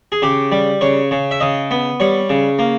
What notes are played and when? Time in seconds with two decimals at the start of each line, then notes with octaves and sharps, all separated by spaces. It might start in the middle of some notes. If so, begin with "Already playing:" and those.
0.12 G#4
0.22 C#3 G4
0.52 G3
0.81 C#3 C#5
1.11 C#3
1.31 E5
1.40 C#3 D#5
1.71 B3
2.00 G3 C#5
2.29 C#3
2.59 A#3